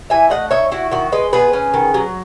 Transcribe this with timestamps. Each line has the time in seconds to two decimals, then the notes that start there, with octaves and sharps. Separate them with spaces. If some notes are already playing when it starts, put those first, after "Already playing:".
0.10 E3 E5 G#5
0.30 A3 D#5 F#5
0.51 D#4 C#5 E5
0.72 E4 F#4
0.91 D#3 F#4
1.12 G#3 B4 D#5
1.33 B3 G#4 B4
1.53 C#4
1.74 D#3
1.94 F#3